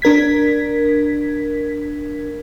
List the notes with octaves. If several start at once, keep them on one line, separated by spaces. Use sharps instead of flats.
D4 A#4 G#6 B6